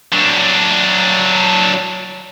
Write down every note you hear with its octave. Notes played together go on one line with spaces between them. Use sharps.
F#3 D4